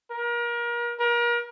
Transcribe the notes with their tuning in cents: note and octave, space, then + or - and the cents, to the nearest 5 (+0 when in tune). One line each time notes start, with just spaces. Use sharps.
A#4 +35
A#4 +35